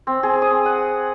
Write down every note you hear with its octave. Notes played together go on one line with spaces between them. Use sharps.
C4
G#4
D#6
F#5